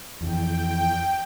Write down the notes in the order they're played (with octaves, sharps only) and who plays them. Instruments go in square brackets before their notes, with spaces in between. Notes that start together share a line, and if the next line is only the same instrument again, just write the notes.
[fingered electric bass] F2 E3 [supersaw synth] G5